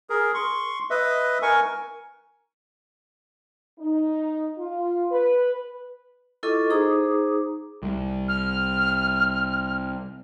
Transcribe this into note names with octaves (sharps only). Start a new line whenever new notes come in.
G#4 A#4
C6 C#6
B4 D#5 E5
A#4 G#5 C#6
D#4
F4
B4
E4 F4 A4 D#5 C#6 D6
D#4 G#4 C5 A#5 D6 D#6
C2
F6